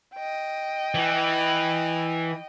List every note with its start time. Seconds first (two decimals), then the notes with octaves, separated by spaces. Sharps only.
0.15 D#5 G5
0.94 E3